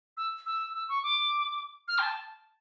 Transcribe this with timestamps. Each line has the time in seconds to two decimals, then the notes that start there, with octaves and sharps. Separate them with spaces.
0.17 E6
0.46 E6
0.74 E6
0.89 C#6
1.03 D6
1.88 F6
1.99 G5
2.02 A5